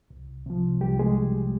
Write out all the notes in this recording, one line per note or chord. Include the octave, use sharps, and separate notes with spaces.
C2
C3 F3
C2 G3 G4
G#3 G#4